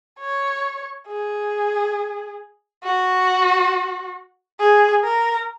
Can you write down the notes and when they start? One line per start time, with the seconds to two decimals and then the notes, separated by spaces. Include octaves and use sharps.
0.20 C#5
1.07 G#4
2.84 F#4
4.60 G#4
5.04 A#4